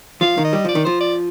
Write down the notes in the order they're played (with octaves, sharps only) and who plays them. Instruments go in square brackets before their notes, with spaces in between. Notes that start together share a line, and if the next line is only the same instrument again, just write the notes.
[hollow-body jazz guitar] F3 [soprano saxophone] F5
[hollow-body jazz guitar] D#3
[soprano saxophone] D#5
[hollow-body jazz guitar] G3
[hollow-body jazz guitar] F3 [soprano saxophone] D5
[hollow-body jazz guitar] D#3
[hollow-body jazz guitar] F3 [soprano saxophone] C5
[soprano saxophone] D5